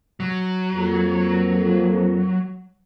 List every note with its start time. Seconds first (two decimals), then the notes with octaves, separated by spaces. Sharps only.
0.20 F#3
0.75 F2 A#3